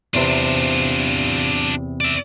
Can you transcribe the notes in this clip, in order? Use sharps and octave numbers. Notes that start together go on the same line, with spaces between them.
E2 C3 D4 F4 C5
D5 E5